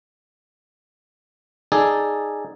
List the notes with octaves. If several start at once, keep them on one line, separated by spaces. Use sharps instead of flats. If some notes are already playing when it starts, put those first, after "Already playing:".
D#4 G#4 A4 D5